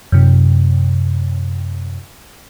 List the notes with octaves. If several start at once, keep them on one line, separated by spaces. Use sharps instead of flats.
F#2 C3